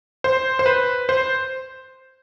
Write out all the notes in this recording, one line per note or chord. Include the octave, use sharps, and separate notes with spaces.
C5
C5
B4
C5